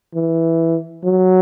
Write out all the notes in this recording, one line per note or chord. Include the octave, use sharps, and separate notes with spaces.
E3
F#3